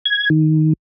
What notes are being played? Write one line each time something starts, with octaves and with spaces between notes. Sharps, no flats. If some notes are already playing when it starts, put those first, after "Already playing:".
G#6
D#3